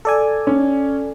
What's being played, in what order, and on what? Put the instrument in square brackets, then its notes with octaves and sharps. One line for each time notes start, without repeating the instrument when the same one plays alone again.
[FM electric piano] A4 D5 G#5
[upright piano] C#4